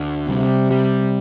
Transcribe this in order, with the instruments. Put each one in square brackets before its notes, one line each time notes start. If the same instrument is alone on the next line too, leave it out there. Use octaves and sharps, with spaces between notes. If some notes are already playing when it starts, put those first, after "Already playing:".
Already playing: [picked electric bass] D2
[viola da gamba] C3 [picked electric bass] G3
[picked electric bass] G3